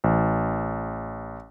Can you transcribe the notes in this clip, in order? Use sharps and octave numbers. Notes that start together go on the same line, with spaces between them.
A1